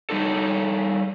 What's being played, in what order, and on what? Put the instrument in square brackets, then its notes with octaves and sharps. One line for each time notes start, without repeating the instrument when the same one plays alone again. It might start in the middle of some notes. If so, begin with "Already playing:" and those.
[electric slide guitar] G3 D#4 A4